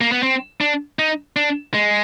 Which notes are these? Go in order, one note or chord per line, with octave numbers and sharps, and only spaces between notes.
A#3
B3
C4
D4
D#4
D4
G#3